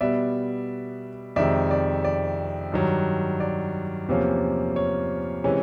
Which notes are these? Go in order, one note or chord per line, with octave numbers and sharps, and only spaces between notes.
B2 G3 B3 D5 E5
F2 C3 D#3 G#3 D5 E5
D5
D5
G2 D#3 F#3
D5
E2 C3 F3 A#3 C#4
C#5
C3 E3 G#3 C#4